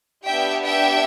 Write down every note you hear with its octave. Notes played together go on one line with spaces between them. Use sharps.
B3 D4 G4 E5 G5
E5 G5